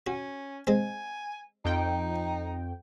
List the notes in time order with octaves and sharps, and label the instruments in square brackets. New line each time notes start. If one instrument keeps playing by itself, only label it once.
[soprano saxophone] C#4 [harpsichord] F#4
[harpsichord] G#3 C4 [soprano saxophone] G#5
[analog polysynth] F2 G5 [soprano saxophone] D#4